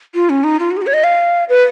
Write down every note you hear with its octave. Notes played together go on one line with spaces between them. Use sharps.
F4
C#4
D#4
F4
F#4
G#4
F#4
C#5
D#5
F5
B4